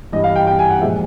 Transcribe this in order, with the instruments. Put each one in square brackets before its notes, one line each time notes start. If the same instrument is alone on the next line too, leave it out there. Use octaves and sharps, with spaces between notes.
[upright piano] G2 E3 G3 D#5
F5
G5
G5
G#5
F#5
A#2 F3 G#3 E5